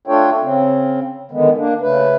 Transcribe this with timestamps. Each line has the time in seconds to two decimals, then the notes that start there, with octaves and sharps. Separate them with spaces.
0.07 A3 D4 F4 A4 C#5 G5
0.42 C#3 C4
1.31 D3 D#3 G#3 B3
1.57 A#3 D4
1.81 C#3 A3 B4